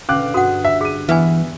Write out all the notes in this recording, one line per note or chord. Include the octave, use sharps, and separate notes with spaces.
G#1 B2 D3 C#4 F5 D6 F#6
G2 F#4 F#5 D#6 C7
E5
G#4 B6 D#7
E3 B3 B4 E5 G#5